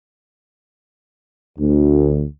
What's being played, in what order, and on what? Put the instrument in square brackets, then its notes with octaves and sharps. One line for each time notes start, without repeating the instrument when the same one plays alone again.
[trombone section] D2